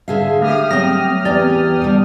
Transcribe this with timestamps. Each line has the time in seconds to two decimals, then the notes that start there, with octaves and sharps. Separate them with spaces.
0.08 D3 G#4 E5 F5
0.42 A3 G4 D#6 F6
0.71 F#3 C4 A#6
1.25 E2 D5 G#5
1.82 D3 G3